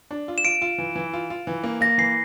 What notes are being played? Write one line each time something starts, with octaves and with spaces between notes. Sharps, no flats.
D4
F4
E7
F4 D7
F4
E3
E3
F4
F4
E3
A#3
A#3 A#6
E3 C7